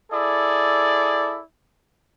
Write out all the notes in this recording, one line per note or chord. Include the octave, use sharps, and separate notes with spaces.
E4 G#4 A4 D5